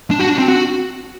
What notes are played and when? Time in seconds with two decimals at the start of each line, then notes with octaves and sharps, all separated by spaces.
0.11 D4
0.19 F#4
0.29 D4
0.38 C4
0.48 F#4